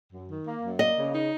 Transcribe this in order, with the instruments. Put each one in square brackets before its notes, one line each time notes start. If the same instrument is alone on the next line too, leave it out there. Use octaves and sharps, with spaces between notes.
[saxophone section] F#2
D#3
A#3
F#2
[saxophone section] A#3 [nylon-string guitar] D#5
[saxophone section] C#3
D#4